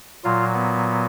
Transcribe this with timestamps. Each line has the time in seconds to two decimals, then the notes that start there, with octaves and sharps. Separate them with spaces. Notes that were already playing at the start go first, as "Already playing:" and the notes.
0.24 A#2 F#3 F4
0.54 B3